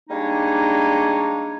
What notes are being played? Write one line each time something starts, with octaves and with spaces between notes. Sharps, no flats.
G3 G#3 A#3 D4 D#4 C#5